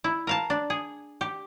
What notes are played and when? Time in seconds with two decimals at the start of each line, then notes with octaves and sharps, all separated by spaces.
0.04 E4
0.27 A#4 F5 A5
0.50 D4
0.70 G#4
1.21 G4